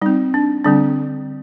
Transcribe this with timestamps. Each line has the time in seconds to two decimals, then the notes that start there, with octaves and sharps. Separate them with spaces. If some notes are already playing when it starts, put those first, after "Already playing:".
0.02 G3 C4 D#4
0.34 D4
0.65 D3 G3 C4 D4